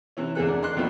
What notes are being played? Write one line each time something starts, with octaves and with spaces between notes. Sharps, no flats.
C3 E3 C#4
E2 D3 G#3 G#4 A4 F#6
D4 A#4
D4 D#5 C6 F#6
D#2 B2 E3 F3 A3 A#3